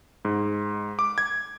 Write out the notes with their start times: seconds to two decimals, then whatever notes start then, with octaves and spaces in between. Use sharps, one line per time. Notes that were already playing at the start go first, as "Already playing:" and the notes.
0.25 G#2
0.99 D6
1.18 G#6